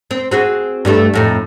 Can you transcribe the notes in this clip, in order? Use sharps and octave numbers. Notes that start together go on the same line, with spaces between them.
C4
C4 F#4 G#4
G2 G3 A3
F2 A2 D#4